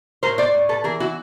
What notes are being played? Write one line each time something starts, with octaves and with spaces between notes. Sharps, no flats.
A2 A#4 C5
C5 D5
A2
A4 B4
E3 G#4 A#4
E4 F#4